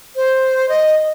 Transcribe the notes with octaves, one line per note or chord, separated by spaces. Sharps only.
C5
D#5